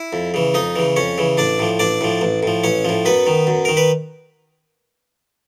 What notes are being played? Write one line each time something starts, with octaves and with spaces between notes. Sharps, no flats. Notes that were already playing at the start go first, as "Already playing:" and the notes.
Already playing: E4 E5
F2
C#3 E3
F2 D#4 D#5
C#3 E3
F2 C#4 C#5
C#3 E3
A1 D4 D5
A2 F3
A1 D4 D5
A2 F3
A1
A2 F3
A1 C#4 C#5
A2 F3
F#2 B3 B4
D#3
F#2
D#3 A#4
B4